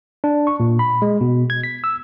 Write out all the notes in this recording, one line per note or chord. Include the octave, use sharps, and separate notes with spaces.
D4
C#6
A#2
B5
G#3
B2
G#6
B6
E6